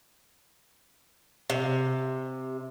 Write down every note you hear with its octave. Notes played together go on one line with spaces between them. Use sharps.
C3